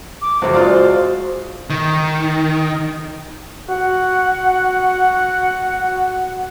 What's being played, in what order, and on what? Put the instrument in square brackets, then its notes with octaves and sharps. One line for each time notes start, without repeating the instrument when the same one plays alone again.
[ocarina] D6
[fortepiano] C#2 F#2 [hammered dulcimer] F#4 [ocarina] C5
[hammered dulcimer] G#3 [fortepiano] F4 D5 F5
[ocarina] C5
[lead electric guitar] D#3
[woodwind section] F#4 F#5